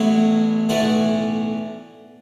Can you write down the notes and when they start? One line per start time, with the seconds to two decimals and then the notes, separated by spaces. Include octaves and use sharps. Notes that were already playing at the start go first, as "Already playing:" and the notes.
Already playing: A1 A2 F#3 B3 D4 E4
0.69 B1 A2 E3 D5 F#5